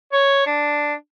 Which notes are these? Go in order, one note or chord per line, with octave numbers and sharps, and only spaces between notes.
C#5
D4